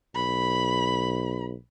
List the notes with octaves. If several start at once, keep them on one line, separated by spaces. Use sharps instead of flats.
B1 B5